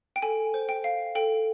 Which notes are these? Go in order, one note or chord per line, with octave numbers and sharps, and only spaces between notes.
G5
A4 G#5
C5
G5
F5
A4 G5